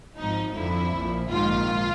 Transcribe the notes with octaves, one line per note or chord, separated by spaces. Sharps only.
G#1 G#2 F3 D#4
F2 D3 F3 E4
A#1 A#2 F3
A#1 G#2 D#3 F4